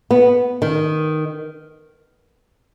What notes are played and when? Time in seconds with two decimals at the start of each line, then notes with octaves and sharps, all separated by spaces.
0.11 B3
0.62 D#3